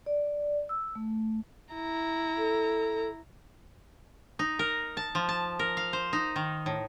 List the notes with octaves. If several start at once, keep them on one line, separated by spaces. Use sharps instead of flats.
D5
E6
A3
E4 A#5
A4
D#4
A#4
A5
F3
A5
A#4
F5
C5
D#4
D#3
A2